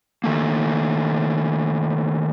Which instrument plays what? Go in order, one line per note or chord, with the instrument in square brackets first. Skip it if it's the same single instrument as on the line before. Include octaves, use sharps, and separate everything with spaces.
[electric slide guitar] D#3 A3 A#3